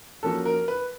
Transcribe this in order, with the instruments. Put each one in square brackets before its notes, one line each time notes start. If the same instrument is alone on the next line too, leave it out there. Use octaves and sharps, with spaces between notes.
[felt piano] F3 A#3 C#4 F#4 [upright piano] A4
[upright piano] A#4
B4